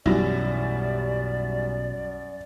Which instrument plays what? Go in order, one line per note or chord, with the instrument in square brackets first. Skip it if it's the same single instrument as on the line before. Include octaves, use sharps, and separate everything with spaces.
[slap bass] B1 [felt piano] F#2 A#6 [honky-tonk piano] E3 G3 E4 [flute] D5